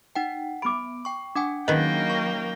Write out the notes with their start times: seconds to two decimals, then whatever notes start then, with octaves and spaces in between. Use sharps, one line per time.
0.15 D#4 F#5 G5
0.62 B3 B5 D6 D7
1.05 G5 C#6
1.35 D4 F#5 G#5 D6
1.68 D#3 F#3 A#3 C#4 D#4 B4 D#5 G5
2.10 C#6